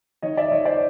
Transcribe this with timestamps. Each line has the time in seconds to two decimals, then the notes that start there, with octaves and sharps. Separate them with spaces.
0.22 D#3 C#5 D#5
0.37 D5 E5
0.52 D#3 C#5 D#5
0.65 C5 D5